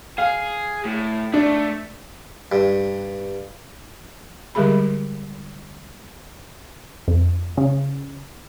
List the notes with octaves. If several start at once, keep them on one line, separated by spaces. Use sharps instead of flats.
G#4 F5
A2
A3 D4
G2
D3 G3 G#3 G4 G#4 B5
F2
C#3